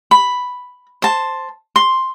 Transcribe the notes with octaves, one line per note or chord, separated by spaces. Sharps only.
B5
C5 A5
C6